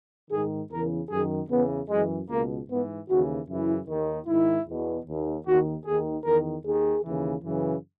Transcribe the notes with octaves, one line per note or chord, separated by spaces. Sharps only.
G#2 D#3 G#4
E2 C#3 E3 A#4
F#2 D#3 G#4
E2 C#3 E3 B3
F#2 E3 G#3
C#2 B2 A#3
G#2 E3 B3
D#2 C#3 E3 F#4
F#2 C#3 E3 E4
D#2 D#3
G#2 D#3 E4
E2 B2
D#2 D#3
D#2 D#3 F#4
D#2 D#3 G#4
E2 D#3 A#4
D#2 D#3 G#4
D#2 C#3 E3
F#2 C#3 E3